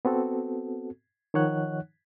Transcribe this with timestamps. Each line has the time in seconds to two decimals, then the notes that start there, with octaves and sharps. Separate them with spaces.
0.05 B3 C4 F#4 A4
1.34 D#3 F3 D#4 C#5 F#5 F#6